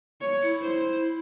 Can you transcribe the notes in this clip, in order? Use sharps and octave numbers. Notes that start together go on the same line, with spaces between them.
C#5
E4
C5